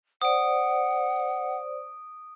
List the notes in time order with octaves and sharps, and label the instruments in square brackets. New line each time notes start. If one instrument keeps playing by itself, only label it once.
[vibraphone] C5 D5 [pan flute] F#5 [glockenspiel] D#6 D7